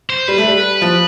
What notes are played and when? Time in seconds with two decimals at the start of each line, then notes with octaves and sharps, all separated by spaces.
0.10 C5
0.28 G3 B4
0.38 A3
0.48 G3
0.82 F3